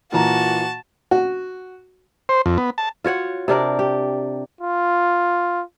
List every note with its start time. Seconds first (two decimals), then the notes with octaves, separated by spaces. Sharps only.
0.12 A#2 E3 F#4 A5 A#5
1.11 F#4
2.29 C5
2.46 F2
2.58 B3
2.78 A5
3.04 F4 F#4 C#5 F#5
3.48 C3 D4 A#4 D5
3.79 G4
4.61 F4